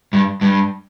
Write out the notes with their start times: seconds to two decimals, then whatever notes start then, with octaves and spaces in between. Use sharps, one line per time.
0.13 G2
0.41 G2